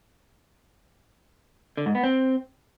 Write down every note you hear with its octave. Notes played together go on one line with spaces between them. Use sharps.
D3
G#2
B3
C4